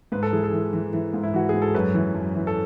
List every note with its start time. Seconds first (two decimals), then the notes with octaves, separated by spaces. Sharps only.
0.12 G#2 B4
0.23 A4
0.32 E3 G#4
0.44 A4
0.53 E3
0.73 E3
0.93 E3
1.14 G#2
1.23 E4
1.34 E3 F#4
1.49 G#2 G#4
1.62 A4
1.75 F#2 B4
1.94 E3
2.15 F#2
2.35 E3
2.47 A4